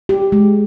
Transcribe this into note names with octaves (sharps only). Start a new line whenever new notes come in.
G4
G#3